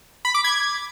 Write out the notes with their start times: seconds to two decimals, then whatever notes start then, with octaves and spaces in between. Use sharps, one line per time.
0.25 B5
0.35 D6
0.44 G#6